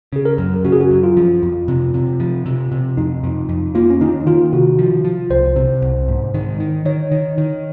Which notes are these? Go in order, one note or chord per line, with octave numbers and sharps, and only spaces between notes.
C#3 G#4
A#4
F#2
C#3 F#4
G#4
F#4
F#2
F4
F3
F2
C3
C3
F3
C3
C3
F2 D#4
F2
F2
A#3 F4
C#4
D#3 D#4
D#3 F4
C3 F#4
F3
F3
C2 C5
C3
C2
G#2
D#3
D#3
D#3 C#5
D#3
D#3